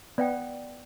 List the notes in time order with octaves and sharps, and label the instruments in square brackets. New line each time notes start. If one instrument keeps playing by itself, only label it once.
[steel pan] B3 [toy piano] D5 F5 G5